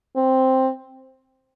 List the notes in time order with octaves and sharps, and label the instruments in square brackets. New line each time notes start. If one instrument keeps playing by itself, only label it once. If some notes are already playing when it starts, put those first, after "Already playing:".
[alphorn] C4